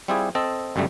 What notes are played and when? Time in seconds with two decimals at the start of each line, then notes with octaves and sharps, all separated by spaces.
0.08 G3 C4 E4 F4 G4 G#4
0.35 C4 A4 D#5
0.76 G1 F#2 C#3 G3 A3